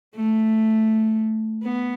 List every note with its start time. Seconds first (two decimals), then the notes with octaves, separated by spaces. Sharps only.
0.16 A3
1.63 B3